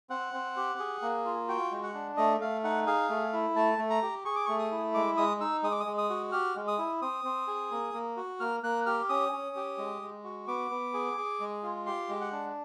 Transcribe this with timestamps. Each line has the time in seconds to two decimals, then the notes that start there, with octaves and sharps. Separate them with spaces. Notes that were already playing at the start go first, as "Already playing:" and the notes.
0.10 C4 F#5
0.34 C4
0.56 G4
0.79 G#4
1.02 A#3
1.25 F4
1.48 F#4 G5
1.71 G#3
1.83 F#5
1.94 D4
2.17 A3 D#5
2.41 A3 F5
2.64 D#4 F#5
2.87 G#4 F5
3.09 A3
3.33 E4
3.56 A3 A5
3.78 A3
3.90 A#5
4.02 G4
4.25 G#4 C#6
4.36 D6
4.46 A3 C#6
4.59 D#6
4.71 E4
4.94 G#3 D6
5.17 G#3 D#6
5.40 D#4 E6
5.63 G#3 D#6
5.72 D6
5.80 D#6
5.86 G#3
5.98 D#6
6.10 F#4
6.32 G4 F6
6.55 G#3
6.68 D#6
6.78 E4
7.02 C4 D#6
7.25 C4
7.47 G#4
7.71 A#3
7.94 A#3
8.17 F#4
8.40 A#3 F6
8.63 A#3 F#6
8.86 G4 F6
9.09 C#4 D#6
9.32 C#4
9.56 G4
9.78 G#3
10.02 G#3
10.24 F#4
10.48 B3 D6
10.71 B3
10.94 G#4
11.17 G#4
11.40 G#3
11.63 F4
11.86 G4 C6
12.09 G#3
12.21 F#5
12.32 D4